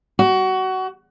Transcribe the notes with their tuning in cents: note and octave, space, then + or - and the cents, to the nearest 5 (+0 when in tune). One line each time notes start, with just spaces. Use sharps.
F#4 +25